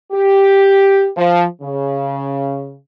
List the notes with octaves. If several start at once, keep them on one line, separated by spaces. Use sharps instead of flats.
G4
F3
C#3